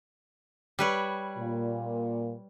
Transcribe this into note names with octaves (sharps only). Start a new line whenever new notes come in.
G3 B4 C#5
A#2